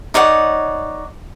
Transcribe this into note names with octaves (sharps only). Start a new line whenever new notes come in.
D#4 C#5 D5 F#5